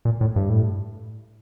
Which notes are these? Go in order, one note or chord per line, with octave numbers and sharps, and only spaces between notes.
A#2
A2
G2
A2